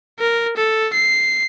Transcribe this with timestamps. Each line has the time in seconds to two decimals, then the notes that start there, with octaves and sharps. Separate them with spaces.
0.20 A#4
0.57 A4
0.93 C7